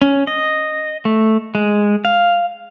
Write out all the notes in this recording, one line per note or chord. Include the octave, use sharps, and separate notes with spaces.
C#4
D#5
A3
G#3
F5